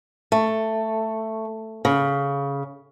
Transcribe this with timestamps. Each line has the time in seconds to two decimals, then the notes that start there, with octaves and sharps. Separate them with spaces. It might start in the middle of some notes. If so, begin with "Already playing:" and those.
0.32 A3
1.85 C#3